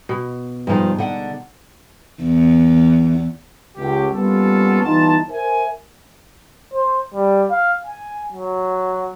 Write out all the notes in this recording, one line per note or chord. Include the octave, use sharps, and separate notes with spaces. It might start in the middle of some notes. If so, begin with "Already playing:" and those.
B2
G2 F3 G#3 D#4
D3 F#5
E2
C#2 G4
G3 A#3 B3 C#4 F4 A4
G1 E3 D#4 F4 A5
A#4 C5 E5 G#5
C5
G3
F5
G#5
F#3